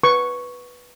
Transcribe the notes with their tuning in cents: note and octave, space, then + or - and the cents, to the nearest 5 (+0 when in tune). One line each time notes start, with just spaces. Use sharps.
B4 -5 C#6 +0